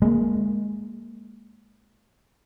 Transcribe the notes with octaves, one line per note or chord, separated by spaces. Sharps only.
G#3 A#3